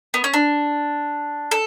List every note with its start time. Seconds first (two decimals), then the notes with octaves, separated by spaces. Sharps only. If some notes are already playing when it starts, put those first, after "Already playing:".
0.14 B3
0.24 C#4
0.34 D4
1.51 A4